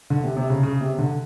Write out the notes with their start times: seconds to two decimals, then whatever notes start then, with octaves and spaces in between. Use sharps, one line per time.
0.10 D3
0.24 C3
0.37 C3
0.50 C#3
0.63 C#3
0.81 C3
0.98 D3